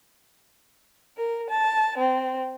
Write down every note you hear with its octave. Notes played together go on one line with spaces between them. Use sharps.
A#4
A5
C4